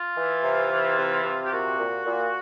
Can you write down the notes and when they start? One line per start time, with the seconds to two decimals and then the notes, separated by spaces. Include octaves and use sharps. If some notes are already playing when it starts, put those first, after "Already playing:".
Already playing: F4
0.17 E3
0.43 C3
0.71 E3
0.98 C3
1.24 C3
1.43 G4
1.52 A#2 F#4
1.79 A#2
2.06 A#2